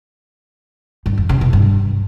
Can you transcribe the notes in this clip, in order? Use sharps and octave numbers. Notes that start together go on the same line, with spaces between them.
G2
F2
C#3
B2
G2